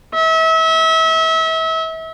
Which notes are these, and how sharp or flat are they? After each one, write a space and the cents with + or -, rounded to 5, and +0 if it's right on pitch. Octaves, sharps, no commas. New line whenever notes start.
E5 -35